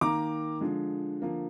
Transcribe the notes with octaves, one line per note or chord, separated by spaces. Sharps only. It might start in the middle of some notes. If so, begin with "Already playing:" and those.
D#3 A#3 A#5 D6
D3 F3 G#3
D3 F3 A#3